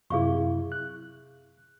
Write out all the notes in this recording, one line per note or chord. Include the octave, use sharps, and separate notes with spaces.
F#2 C3 E4 G#4 F5 C#6
F#6